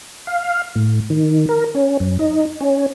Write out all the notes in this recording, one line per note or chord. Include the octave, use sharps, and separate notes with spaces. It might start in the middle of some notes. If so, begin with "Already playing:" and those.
F5
A2
D#3
A#4
C#4
F#2
D#4
C#4